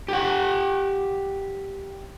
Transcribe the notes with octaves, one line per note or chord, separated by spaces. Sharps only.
G4 F#5